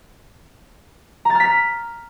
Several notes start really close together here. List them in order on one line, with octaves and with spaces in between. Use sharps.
A#5 A6 F6 B6